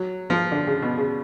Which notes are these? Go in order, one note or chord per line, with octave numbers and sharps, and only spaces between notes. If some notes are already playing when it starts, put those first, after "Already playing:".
Already playing: F#3
F3
D3
C#3
B2
C#3